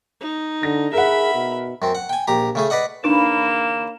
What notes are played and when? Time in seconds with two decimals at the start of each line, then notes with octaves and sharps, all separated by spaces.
0.21 D#4
0.63 D3 A#6
0.93 G#4 A#4 E5 F#5 B5
1.34 B2
1.82 F#2 C4
1.95 F#5
2.09 G5 G#5
2.27 A#1 G4 A#5
2.55 C#3 A3 G#4
2.70 B4 D5 D#5 F#5
3.04 D#2 C#3 A#3 B3 D4 D#4 B4 E7